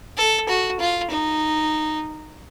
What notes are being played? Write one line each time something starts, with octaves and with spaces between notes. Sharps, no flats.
A4
F#4
F4
D#4